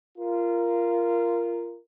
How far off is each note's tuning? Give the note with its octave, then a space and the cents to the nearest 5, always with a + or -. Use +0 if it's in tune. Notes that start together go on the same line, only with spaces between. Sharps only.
F4 -20 A#4 +0